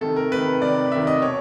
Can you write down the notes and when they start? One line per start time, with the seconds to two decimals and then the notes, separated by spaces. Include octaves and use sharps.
0.01 C3 D#3 A4
0.16 A#4
0.31 C3 D#3 B4
0.62 C3 D#3 D5
0.92 C3 D#3 E5
1.07 D#5
1.22 B2 C#5